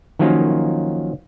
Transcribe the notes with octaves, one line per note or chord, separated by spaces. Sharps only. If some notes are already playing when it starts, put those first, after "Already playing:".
D#3 F3 F#3 A#3 C#4 F4